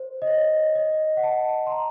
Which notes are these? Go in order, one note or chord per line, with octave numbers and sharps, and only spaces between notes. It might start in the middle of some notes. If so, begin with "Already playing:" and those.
Already playing: C5
D#5
C#5
D#5
F#5
A5
C6
A#5